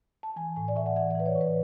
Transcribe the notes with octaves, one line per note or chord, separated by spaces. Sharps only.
A5
E3 G#5
A2 G#5
D5
A2 E5
F#5
E3 E5
D5
E3 B4
C#5
A2 B4